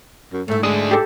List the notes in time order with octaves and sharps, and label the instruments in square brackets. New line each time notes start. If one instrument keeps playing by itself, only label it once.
[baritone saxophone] F#2
[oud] G#2 E4 [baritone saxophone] A3
[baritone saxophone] G#3 [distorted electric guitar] A3 D4 [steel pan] D#6
[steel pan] G4 A4